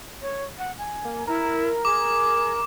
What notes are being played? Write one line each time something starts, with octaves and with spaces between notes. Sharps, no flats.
C#5
F#5
G#5
A#3
E4 A#4
G#4 D6